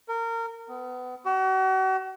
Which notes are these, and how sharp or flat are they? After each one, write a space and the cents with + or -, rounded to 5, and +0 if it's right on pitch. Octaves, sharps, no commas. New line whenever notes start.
A#4 -25
B3 +25
F#4 +40